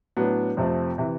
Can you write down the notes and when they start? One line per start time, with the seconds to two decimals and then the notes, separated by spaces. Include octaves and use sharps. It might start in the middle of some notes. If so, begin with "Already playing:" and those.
0.17 A2 F#3 B3 D4
0.57 F2 C3 F3 A3 C4
0.98 C3 E3